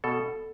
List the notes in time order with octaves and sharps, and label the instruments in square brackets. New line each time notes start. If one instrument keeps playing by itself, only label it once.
[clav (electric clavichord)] B2 A4